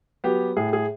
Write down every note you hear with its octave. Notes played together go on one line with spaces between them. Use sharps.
F#3 B3 G4
A2 G#4
G#4